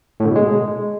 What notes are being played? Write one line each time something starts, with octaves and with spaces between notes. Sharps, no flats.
A2
D3
B2
G#3